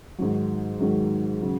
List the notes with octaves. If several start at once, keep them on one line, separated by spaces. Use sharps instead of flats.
G#2 D#3 F#3
G#2 D#3 F#3
C#3 F#3